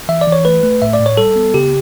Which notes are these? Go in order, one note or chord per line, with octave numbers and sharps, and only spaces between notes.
E3 E5
D5
E3
C#5
A3 B4
A3
A2 E5
D5
A2
C#5
G3 A4
B3
C#3 G4